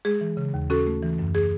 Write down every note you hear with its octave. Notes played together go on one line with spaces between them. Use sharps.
G#3 G#4
E3
C#3
D#2
C#4 F#4 A4
A3
E3
F#2
G#4